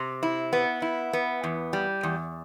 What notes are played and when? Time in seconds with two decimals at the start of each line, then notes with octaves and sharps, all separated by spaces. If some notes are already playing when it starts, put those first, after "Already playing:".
Already playing: C3
0.23 E4
0.53 B3
0.82 E4
1.13 B3
1.44 E2
1.73 G3
2.03 E2